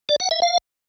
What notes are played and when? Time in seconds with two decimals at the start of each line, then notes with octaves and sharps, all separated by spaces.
0.09 D5
0.20 F#5
0.31 E5
0.42 F5